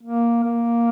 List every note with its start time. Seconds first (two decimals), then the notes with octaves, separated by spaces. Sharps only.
0.03 A#3
0.44 A#3